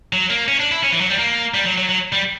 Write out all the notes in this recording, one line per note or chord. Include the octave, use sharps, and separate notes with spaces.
F#3
A#3
C#4
D4
E4
C#4
E3
F#3
G3
A#3
G3
F#3
F#3
F#3
G3